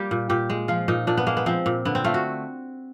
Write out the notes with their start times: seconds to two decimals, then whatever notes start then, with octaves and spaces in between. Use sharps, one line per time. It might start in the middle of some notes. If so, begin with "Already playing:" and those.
Already playing: G3 A#3 G4
0.11 A#2
0.29 A#2 G4
0.50 G#3
0.68 F3 F4
0.88 A#2 D#4
1.07 A#2 D4
1.17 B3
1.27 G#3 A#3
1.37 B3
1.46 F3 C4
1.66 A#2
1.85 D3 B3
1.95 C4
2.04 A3 F4
2.14 F#4